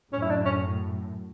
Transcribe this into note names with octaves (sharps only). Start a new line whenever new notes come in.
F#2 A2 C#4
E4
D4
C#4